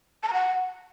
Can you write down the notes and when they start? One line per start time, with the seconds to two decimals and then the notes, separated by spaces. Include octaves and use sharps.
0.23 A5
0.28 A#5
0.33 F#5